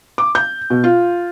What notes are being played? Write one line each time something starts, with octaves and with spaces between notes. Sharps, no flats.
D6
G6
B2
F4